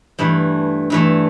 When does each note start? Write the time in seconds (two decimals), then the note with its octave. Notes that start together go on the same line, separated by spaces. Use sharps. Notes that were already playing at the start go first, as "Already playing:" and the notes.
0.19 G2 E3 A3
0.90 G2 E3 A3